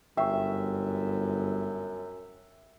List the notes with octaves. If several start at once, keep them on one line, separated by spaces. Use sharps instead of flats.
G1 F#2 E5 G5 C#6